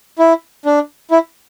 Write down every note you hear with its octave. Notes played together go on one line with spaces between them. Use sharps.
E4
D4
E4